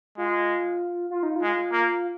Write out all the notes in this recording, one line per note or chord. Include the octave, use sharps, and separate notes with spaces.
G#3 F4
F4
D#4
F4
G#3
A#3